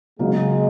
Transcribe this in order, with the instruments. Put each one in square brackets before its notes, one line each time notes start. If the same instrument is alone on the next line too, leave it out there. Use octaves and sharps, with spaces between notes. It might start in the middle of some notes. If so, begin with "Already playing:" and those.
[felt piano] C#3 F#3 A#3 [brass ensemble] G#3